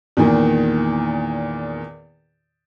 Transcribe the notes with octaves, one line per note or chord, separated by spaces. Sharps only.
E2 A#2 D#3